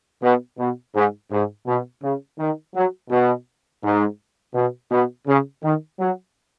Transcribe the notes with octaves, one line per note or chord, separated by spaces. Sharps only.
B2
B2
G#2
G#2
B2
C#3
D#3
F#3
B2
G#2
B2
B2
C#3
D#3
F#3